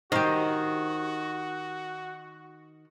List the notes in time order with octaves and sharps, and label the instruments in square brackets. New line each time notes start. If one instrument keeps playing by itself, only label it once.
[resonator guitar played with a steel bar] D#3 [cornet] F#4 [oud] G4 C5